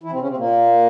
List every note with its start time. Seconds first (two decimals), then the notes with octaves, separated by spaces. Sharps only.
0.03 E3 E4
0.12 C3 C4
0.20 C#3 C#4
0.28 C3 C4
0.37 A#2 A#3